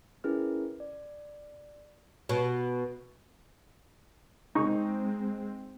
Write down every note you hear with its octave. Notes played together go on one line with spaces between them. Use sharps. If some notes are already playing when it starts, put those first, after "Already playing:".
C#4 E4 G#4 A#4 B4 F6
D5
B2
G#3 C4 D#4 C#6